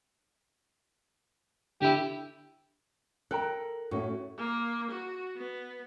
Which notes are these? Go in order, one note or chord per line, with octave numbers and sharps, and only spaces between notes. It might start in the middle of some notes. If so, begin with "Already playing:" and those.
D3 E4 G4
A4 A#4 G5 A#5 F#6
A2 A3 C#4 F#4
A#3
F#4
B3